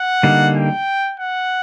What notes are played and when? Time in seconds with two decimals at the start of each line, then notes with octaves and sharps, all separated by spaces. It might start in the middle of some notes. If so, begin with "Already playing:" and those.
Already playing: F#5
0.23 D3 G3 A#3 D#4
0.56 G5
1.20 F#5